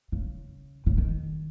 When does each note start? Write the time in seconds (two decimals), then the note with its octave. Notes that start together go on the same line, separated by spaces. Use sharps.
0.12 C#3
0.86 C#3
0.98 D#3